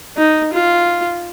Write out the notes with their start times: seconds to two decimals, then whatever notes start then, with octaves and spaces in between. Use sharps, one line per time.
0.17 D#4
0.53 F4